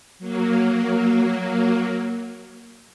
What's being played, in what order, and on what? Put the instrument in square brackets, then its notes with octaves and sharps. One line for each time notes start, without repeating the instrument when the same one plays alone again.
[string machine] F#3 A#3